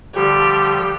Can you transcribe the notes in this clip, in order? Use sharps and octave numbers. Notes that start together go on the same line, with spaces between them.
D3 F3 G3 G4